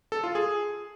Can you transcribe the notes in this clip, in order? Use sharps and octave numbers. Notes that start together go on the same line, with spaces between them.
A4
F4
G#4